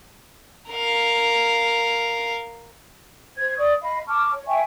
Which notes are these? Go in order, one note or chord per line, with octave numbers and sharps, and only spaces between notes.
A#4 F5
C5 G#6
D5 C#6 D#6
D#5 F5 B5
A5 C#6 D6 F6
C#5
E5 G5 G#5 C#6